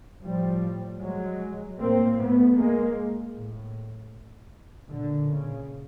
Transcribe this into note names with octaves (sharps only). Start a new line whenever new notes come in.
A2 F3 G3
F#3 G#3
A2 A#3 C4
A3 B3
G#3 A#3
A2
A#2 D3
C#3